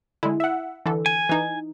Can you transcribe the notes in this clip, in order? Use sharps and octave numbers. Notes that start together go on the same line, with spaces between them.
D3 G#3 E4
E5 F#5
D3 E3 A4
G#5
E3 D#4